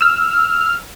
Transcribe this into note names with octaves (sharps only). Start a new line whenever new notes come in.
E6 F6